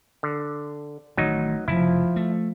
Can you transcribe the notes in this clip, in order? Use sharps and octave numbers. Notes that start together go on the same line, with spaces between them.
D3
A1 D#3 F#3 A3 D#4
F1 C#3 F3 E4
A3